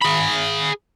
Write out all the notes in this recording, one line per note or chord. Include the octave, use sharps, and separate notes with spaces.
G#4 B5